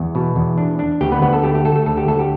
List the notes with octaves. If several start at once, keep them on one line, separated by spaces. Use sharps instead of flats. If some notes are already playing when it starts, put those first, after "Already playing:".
Already playing: E2
B2
E2
D4
D4
D2 G4 G5
B3 B4
D2 B3 B4
A4
A3 G4
G4
A3 A4
A4
D2 A4
G4
D2 A4
G4